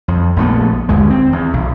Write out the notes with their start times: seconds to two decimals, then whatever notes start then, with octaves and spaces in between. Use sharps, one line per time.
0.08 F2
0.36 A#1 A#2 A3 B3
0.89 G1 D#2 G#3
1.10 C4
1.32 E2
1.53 B1